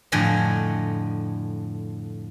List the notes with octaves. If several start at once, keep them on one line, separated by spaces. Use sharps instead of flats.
F2 A2 D3 D#5 G#5